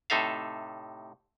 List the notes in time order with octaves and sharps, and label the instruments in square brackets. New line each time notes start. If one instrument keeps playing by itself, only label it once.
[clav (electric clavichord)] A2 C3 D#4 A4 E5 F5